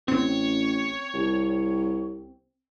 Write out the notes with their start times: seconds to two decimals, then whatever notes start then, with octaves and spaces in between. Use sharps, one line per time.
0.08 A1 C4 C#5
1.14 C2